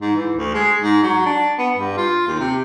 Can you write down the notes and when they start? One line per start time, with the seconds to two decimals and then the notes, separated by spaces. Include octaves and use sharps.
0.01 G#2
0.16 E3
0.35 D2
0.54 G#3
0.81 G#2
1.03 F#3
1.26 D4
1.59 B3
1.77 G2
1.98 F4
2.28 D#2
2.40 C3